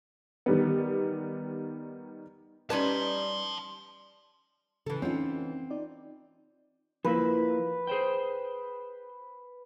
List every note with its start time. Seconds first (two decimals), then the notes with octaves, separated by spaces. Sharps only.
0.46 D#3 G3 B3
2.70 G3 C#4 D#4 B4 A5 C6
4.86 C#3 E3 A4
5.02 C4 C#4 D#4 F4 F#5
5.70 D#4 D5
7.04 F3 A#3 E4 B4
7.87 G#4 C5 G5